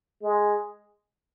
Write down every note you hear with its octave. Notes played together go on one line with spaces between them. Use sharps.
G#3